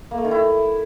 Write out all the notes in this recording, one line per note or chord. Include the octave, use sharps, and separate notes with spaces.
A#3
A3
D#3
E4